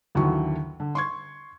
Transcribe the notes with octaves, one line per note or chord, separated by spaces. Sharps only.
G1 D#2 D3 E3 F#3 C#6
D3
C6 C#6 G#6